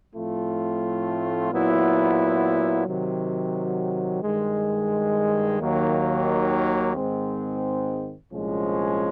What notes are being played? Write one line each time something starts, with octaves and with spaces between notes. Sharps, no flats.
A2 F3 A3 C4 F4
A#2 F#3 B3 E4
C3 D#3 F#3
G2 D#3 G#3
D#2 D#3 F#3 A#3
G#2 D#3 G#3 C4
C2 A#2 F3 G#3 C#4